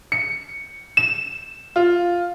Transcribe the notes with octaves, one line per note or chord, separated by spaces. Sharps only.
C#7
E7
F4